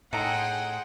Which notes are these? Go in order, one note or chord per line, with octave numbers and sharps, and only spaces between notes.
A2 D#4 G#4 A4 F#5 G5 A#5 C6